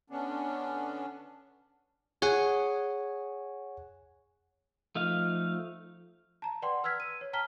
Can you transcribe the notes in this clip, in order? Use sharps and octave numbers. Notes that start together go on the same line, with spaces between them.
D3 B3 C#4 D4
G#4 C#5 F#5 G#5
F3 A3 D#4 F5
A5 A#5
B4 D5 F#5 G5 C6
B4 E6 F6 G#6 B6
D#7
C#5
G5 A5 A#5 F6 B6 G7